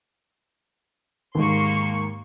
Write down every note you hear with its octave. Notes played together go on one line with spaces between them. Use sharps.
D#2 G#2 A#3 C6 C#6